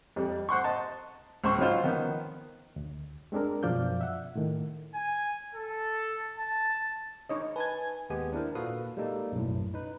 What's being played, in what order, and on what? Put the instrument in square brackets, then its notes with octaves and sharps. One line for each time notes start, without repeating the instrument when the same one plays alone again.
[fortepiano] F2 G3
C5 F#5 C6 C#6
D#5 A5
C#2 C5 C#6
F#3 C#4 D#4 F4 C5
D#3 F3 B3
[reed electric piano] D2
G#3 C4 D4 G#4 A#4
F#2 B2 F3 D5 F5 G6
E5 F#5
A2 D#3
[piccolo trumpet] G#5
A4
A5
[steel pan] D#4 C#5 D#5
[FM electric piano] B4 A5 G#6 [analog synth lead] G#5
[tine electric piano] D#2 G#3 B3 G4 G#5
D4 E4 A#4 C5
A#2 F#4 A4 B4 F5 D#6
G3 G#3 A#3 D#4 A4
B1 F#2 A2
D#4 B4